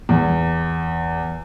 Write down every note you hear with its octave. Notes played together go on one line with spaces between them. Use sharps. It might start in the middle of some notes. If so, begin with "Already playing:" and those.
E2